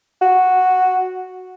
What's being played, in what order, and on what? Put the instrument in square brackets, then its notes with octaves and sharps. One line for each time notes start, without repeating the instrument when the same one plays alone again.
[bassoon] F#4